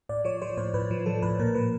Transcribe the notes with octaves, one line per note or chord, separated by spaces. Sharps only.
A2 D5
F3 C#5
F3 C5
A2 C5
A2 B4
F3
F3 A4
A2 B4
A#2 A#4
F3 B4